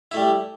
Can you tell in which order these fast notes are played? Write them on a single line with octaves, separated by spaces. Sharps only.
E4 A3 G3